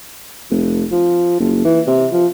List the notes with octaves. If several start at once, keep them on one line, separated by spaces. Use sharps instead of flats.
F1
F3
F#1
E3
C3
F3